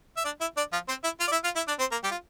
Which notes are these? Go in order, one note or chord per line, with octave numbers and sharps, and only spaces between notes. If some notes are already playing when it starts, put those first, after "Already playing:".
E5
D4 D5
E4 E5
D4 D5
F3 F4
C4 C5
E4 E5
F4 F5
D5
E4 E5
F4 F5
E4 E5
D4 D5
C4 C5
A#3 A#4
G3 G4
F4